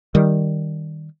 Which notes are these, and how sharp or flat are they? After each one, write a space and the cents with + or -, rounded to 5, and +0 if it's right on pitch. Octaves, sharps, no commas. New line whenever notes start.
D#3 +0 G3 +0